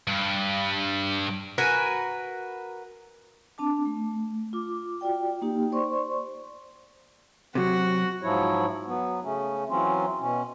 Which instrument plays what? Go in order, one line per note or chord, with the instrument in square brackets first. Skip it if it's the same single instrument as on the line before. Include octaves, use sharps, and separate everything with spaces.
[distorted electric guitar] G2
[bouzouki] F#4 A#4 B4 G#5
[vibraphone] C4 D4 A5 D6
A3
F4 D6
F4 F#4 D5 G5
A#3 D#4 G4
C5 D5 C6 C#6
[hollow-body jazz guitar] C3 F#3 [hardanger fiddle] F#4
[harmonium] G#2 F3 F#3 E4 C#5
F#3 B3
C#3 A3 C#4
E3 F#3 C4 C#4 F4
B2 C#4